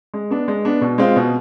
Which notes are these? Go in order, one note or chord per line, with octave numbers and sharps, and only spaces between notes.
G#3
B3 D4
G#3
B3 D4
B2
G#3 C4 F4
B2